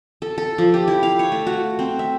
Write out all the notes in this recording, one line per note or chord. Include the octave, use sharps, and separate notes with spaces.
A4
A4
F3
G4
E4
F5
C#5
A3
F#4
C4
E5